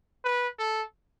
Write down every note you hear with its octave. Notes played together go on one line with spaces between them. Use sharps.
B4
A4